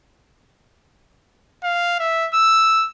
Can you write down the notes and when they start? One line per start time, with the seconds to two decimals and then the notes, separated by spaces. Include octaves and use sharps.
1.64 F5
1.99 E5
2.34 E6